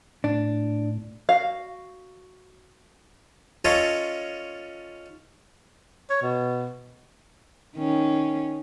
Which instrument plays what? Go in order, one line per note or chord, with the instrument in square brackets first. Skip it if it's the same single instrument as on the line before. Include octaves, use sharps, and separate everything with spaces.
[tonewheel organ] A2 [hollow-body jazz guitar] D4
[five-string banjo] F#4 F5
[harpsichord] C#4 F4 A4 C#5 D#5
[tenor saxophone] C#5
B2
[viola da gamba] D#3 C#4